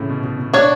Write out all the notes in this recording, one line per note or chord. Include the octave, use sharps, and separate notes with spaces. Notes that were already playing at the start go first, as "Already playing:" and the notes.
Already playing: A2 C#3 E3
B2
B2
B2
B2 D4 F#4 C#5